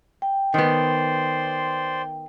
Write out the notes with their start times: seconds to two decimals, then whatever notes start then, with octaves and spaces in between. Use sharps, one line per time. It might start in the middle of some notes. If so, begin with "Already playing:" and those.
0.22 G5
0.54 D#3 B3 C5 D5 C6